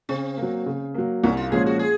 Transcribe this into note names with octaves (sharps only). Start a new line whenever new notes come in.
C#3 C4
A#3
F#3
C#3
F#3 A#3
C2 C#4
F4
A#2 F3 G#3 C#4 G#4
F#4
G#4